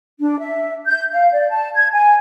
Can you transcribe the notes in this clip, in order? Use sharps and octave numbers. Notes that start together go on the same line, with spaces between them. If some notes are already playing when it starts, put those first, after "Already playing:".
D4
E5
G6
F5
D5
A5
G#6
G#5